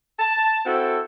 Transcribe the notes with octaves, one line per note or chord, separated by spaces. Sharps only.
A5
C4 E4 F#4 A4